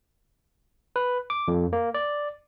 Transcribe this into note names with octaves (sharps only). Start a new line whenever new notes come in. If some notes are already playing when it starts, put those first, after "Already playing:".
B4
D6
F2
A#3
D5